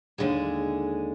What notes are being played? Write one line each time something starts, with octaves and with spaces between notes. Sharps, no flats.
D#2 D3 G#3 G#4